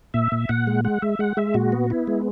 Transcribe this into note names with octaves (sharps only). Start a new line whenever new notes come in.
A#2 E5
A#2
A#2 F#5
G#3
G#3 F#5
G#3 E5
G#3 F#5
G#3 E5
A#2 F#4
B3
B3 E4
G#3